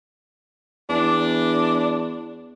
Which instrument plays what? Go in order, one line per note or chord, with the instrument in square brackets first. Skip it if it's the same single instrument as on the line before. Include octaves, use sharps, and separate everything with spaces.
[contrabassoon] E2 [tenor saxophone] D4